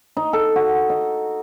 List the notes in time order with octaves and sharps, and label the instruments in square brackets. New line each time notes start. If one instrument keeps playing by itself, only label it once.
[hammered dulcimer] D#4
A4
F#4
D#5